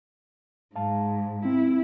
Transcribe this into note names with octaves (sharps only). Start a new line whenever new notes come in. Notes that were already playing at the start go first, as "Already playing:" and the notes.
G#2 F5 A5
C4 E4